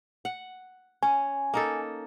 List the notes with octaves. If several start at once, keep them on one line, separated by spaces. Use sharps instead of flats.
F#5
C#4 G#5
A#3 D#4 A4